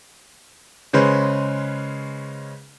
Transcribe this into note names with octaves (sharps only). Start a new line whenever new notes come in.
C#3 G#3 C#4 B4 C5